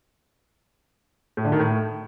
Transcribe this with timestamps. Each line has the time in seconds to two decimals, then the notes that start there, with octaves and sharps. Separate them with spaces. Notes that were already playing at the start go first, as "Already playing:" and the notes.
1.37 A2
1.45 D3
1.52 D#3
1.60 A2